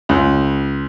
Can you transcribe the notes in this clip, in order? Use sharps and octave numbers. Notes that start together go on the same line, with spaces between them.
C#2